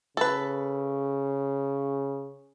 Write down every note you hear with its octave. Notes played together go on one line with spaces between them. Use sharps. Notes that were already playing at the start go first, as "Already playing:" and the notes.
C#3 A4 B4